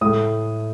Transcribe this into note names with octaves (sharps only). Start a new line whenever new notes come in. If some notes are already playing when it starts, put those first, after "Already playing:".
A2 A3 D#6